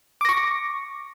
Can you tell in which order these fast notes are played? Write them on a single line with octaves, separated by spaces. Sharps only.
D6 A#6 C#6